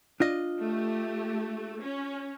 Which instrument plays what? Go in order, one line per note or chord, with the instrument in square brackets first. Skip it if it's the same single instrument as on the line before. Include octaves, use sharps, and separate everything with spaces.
[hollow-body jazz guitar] D4 F4 D#5
[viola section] A3 G4
C#4